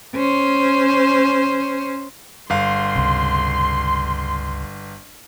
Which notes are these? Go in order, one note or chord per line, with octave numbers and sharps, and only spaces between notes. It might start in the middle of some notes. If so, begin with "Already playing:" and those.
C#4 C5
G1 F5 C6
C#2 C3